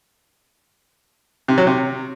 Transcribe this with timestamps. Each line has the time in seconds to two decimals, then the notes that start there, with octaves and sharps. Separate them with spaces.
1.48 C3
1.58 F#3
1.67 C3